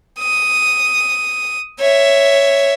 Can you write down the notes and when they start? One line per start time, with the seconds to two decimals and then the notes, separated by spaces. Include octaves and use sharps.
0.20 D#6
1.80 C#5 E5